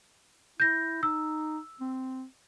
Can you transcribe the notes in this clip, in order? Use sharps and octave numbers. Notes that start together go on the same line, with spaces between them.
E4 G6 A#6
D#4 E6
C4